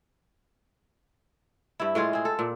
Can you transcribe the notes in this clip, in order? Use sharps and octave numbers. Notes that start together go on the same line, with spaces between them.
G2 E4
A2 G#3 F4 G#4
C4 G#4
A4
A#2